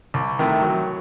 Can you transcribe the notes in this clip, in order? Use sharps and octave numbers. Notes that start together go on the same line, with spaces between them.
C2
C3 D#3 A3 E4
F#3